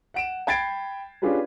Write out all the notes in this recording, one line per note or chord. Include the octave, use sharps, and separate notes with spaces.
F#5 D7 E7
G5 B5 G#6 A6 C7 D7
C#4 D4 F4 G4 G#4 B4